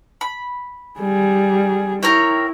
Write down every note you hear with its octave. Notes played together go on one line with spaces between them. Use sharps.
B5
G3 G#4
E4 A#4 C#5 G5